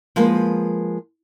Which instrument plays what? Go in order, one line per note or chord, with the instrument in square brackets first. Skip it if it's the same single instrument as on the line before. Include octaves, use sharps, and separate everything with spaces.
[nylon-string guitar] F3 G#3 A#3 A#4 B4